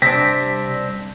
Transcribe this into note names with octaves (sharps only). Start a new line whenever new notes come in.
C3 G3 C4 D4 A#6 B6